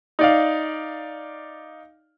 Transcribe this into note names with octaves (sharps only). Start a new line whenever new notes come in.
D#4 D5 F5